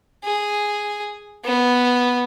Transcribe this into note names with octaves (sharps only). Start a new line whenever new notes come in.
G#4
B3